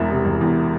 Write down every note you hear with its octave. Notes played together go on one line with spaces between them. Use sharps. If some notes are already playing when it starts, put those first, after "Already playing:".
Already playing: E1 E2 E5
C3
E1
E2